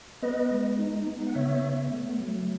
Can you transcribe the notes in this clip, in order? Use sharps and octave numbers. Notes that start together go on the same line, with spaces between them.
B3 B4 D#5
G#3
D#4
B3
F#5
C#3 C#5 E5
B3
A3
F#3